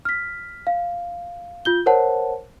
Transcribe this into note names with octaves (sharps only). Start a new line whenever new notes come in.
F6 B6
F5
F4 G6 G7
A#4 C5 C#5 F#5 A5